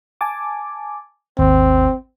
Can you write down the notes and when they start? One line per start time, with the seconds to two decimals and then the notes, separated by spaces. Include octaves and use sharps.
0.21 G#5 A5 D6
1.38 G#1 D#2 C4